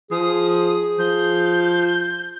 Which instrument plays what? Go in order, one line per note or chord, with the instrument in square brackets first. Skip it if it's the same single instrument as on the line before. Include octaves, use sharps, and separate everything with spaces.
[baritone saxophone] F3 [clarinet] G#4 [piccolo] D#6
[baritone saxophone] F3 [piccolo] G6